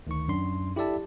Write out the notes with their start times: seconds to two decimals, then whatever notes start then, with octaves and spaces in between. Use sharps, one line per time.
0.07 D2 D#3 C#6
0.28 F#2 D4 C6
0.76 E4 G4 A4 D5 E5 A5